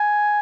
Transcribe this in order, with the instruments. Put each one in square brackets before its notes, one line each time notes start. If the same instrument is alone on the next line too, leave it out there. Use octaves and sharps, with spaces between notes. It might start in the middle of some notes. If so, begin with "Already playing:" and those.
Already playing: [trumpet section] G#5